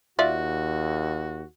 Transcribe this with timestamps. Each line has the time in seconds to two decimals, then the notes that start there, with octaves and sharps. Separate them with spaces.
0.19 D#2 F4 F#4 D5 E5